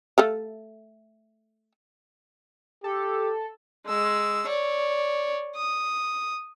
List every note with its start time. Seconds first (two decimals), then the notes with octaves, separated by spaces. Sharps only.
0.18 A3 A4 F5
2.84 G4 A4
3.87 G#3 E6
4.47 C#5 D5
5.56 D#6